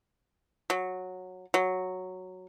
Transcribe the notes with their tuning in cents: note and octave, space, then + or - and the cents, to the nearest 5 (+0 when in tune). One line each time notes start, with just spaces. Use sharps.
F#3 -10
F#3 -5